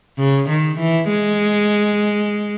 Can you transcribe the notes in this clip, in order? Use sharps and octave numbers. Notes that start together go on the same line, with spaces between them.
C#3
D#3
E3
G#3